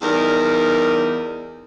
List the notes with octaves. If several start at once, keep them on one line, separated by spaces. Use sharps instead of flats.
E2 G3 D#4 A#4